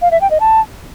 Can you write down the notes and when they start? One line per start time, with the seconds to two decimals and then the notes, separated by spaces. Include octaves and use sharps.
0.02 F5
0.11 E5
0.21 G5
0.31 D#5
0.40 A5